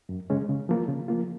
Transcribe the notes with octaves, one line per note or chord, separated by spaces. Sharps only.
F#2
C#3 G#3 C#4
C#3
F3 A#3 F4
C#3
F3 A#3 F4